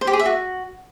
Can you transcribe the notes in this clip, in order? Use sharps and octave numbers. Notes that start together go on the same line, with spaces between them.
C5
G4
G#4
E5
F#4